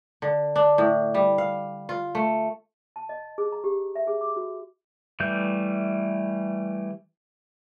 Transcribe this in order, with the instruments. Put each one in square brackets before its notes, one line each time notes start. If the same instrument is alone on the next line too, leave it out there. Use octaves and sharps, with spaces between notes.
[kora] D3
D4
A2
G3
F5
F4
A3
[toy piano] A5
D#5
G#4
A#5
G4
E5
G#4
D6
F#4
[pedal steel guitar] E3 G3 A3 G6